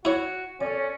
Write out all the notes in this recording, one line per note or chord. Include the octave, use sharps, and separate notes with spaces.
E4 F#4 C#5
C#4 A4 C#5 D5